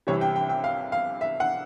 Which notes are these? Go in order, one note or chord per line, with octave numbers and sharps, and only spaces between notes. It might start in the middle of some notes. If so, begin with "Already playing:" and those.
C2 C3 E3 G3 C#5
G5
G5
G5
F5
F5
E5
F#5